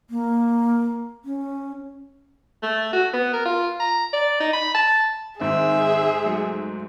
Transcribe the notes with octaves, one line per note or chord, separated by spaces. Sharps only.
A#3
C#4
A3
F#4
B3
A#4
F4
A#5
D5
D#4
B5
A5
G#2 D#3 C4 D#4 G#4 E5
F#3 G#3 A3